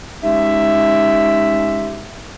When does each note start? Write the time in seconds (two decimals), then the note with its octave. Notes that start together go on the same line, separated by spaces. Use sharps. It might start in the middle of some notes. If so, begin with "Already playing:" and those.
0.23 G#3 C#4 D#4 G4 E5